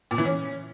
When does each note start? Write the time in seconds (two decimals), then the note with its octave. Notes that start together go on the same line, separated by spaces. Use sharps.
0.11 A#2
0.18 E3
0.25 C#4